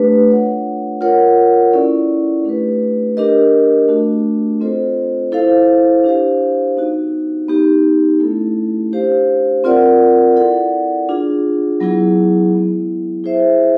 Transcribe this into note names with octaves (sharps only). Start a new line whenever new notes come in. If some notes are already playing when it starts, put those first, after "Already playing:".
Already playing: A3 D4 G4 B4
D4 F4 A4 C#5 F#5
F4 A#4 C#5 F#5
C#4 E4 A4 D5
A3 D4 G4 B4
D4 G4 A#4 D#5
A3 D4 F#4
C4 F4 A4 C5 D#5
E4 A4 C5 F5
D4 G4 C5 F5
B3 D#4 F#4
B3 D#4 G4
A3 C#4 E4 A4
D4 G4 C5 F5
C4 F4 A#4 D5 F#5
E4 A4 D5 F#5
D4 F4 G#4
F#3 B3 E4 G#4
G#3 B3 E4
E4 G#4 C5 E5